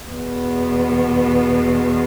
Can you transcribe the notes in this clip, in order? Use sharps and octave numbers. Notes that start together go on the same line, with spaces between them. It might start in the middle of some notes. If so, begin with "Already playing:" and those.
E2 B2 B3